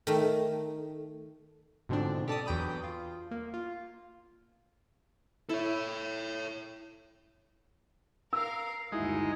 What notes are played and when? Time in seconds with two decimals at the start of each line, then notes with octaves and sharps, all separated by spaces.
0.07 D#3 A3
1.89 G#2 B2 D3 F3 C4 D4
2.28 G4 A4 D5 A5 D6 D#6
2.46 E2 F#3 G5 B5 D#6
2.84 F4
3.31 A#3
3.54 F4
5.49 E4 A4 C#5
8.33 A#4 F5 E6
8.92 G1 D#2 G#3 D#4 E4 F#4